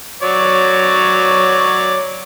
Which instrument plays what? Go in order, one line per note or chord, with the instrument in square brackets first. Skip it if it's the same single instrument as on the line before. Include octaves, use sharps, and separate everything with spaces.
[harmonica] F#3 C#5 D5